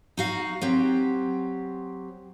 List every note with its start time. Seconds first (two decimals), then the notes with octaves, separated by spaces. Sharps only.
0.17 D#4 F#4 F5
0.62 F#3 C4 G4